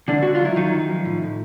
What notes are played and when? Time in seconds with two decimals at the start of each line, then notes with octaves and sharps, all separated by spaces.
0.08 C#2 D3 D4
0.23 C#2 F#4
0.35 F4
0.41 F#3 E4
0.56 F#2 D#3 D#4
0.73 F#2
0.90 F3
1.05 A2
1.22 A2